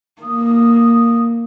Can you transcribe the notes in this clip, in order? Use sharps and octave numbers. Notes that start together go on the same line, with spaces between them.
A#3 D#6